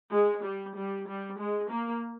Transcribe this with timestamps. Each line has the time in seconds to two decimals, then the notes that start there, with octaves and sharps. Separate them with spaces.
0.12 G#3
0.44 G3
0.76 G3
1.07 G3
1.39 G#3
1.71 A#3